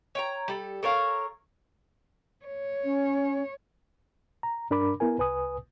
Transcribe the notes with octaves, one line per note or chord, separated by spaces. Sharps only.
C#5 G5 A#5
G3 A4
A4 A#4 C#5 F5
C#5
C#4
A#5
G2 D4 A#4 B5 D6
B3 E4 A#4 G#5
C2 B4 G#5 D#6